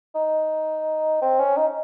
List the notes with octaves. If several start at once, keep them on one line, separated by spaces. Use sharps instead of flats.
D#4
C4
C#4
D#4